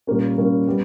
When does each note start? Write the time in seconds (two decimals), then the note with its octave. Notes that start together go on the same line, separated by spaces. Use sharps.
0.07 A#2 G3 A#3 C#4
0.37 A#2 G3 A#3 C#4
0.67 G3 B3